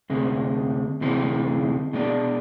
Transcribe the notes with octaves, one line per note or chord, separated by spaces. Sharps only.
D2 C3 G#3
D2 C3 E3 G#3
B2 G#3 D4